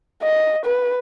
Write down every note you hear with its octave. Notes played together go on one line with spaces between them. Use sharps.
D#5
B4